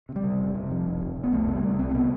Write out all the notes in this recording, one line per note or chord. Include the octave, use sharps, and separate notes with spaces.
C3
G3
C3
F1
C3
F2
F1
F1
F1
B3
C2 A3
C3
G3
C3
C2 C4
A3
C3 B3